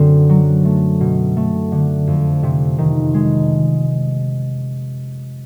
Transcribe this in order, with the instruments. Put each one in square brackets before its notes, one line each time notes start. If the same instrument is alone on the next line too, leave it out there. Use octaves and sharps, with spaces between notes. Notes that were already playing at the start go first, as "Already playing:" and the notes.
Already playing: [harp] F#2 D3 C4
F#3
A3
B2
A3
D3
F2
C3
D#3
G#3